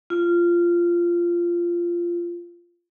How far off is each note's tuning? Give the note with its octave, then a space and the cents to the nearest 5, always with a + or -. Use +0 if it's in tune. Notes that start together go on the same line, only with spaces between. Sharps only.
F4 -15